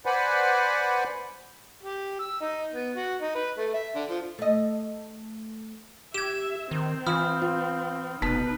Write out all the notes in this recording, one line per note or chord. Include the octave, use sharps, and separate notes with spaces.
B4 C5 D5 F#5 G#5 B5
G4
E6
D#4
B3
F#4
D#4
B4
A3
E5
D3
F3
A3 D#5
G4 E5 G#6 E7
D#3 C4
E3 F4 B5 D#6 F6
F4
F1 B2 D#4 B4 A5 B6